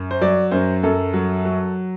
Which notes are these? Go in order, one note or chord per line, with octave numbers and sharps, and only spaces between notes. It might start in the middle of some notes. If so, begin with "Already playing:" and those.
Already playing: F#2
C5
F#3 D5
F#2 C5
F#2 A4
F#3
F#3